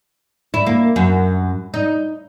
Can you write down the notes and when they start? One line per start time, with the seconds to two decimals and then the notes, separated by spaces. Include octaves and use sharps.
0.54 E4
0.67 A#3
0.96 F#2
1.74 D#4